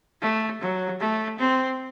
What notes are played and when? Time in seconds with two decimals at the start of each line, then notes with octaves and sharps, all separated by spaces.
0.22 A3
0.61 F#3
1.01 A3
1.39 C4